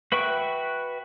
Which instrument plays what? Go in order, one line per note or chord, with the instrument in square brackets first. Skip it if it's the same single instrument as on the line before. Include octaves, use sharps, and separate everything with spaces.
[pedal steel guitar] F#4 B4 E5 G5 C#6